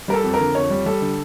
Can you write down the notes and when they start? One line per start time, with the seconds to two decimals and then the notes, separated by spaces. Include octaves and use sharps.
0.08 G3 A#4
0.14 A4
0.24 F2
0.34 A#4
0.40 D3
0.55 F2 C#5
0.70 G3
0.86 G3 A4
1.01 D3